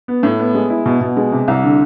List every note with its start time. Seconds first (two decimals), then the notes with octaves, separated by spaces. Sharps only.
0.08 B3
0.23 A2
0.39 B3
0.54 G#3
0.70 E4
0.86 B2
1.01 B2
1.17 G#3
1.32 C3
1.48 C2
1.63 D3